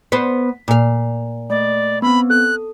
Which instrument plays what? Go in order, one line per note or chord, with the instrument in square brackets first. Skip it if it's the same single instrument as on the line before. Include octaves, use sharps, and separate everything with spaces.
[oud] B3 C5 [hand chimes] B6
[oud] A#2 F5
[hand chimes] A3 [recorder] D5
[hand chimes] B3 C4 [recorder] B5
[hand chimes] A4 [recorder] F#6